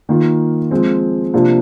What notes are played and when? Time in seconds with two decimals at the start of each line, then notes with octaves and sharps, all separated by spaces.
0.09 D#3 A#3 F4
0.71 F3 G#3 C4
1.34 C3 F3 A#3 D4 F4